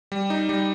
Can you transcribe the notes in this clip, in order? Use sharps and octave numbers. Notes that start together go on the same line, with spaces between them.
G3
D#4
G3